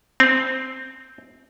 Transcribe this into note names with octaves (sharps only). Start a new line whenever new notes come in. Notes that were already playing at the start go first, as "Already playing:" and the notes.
C4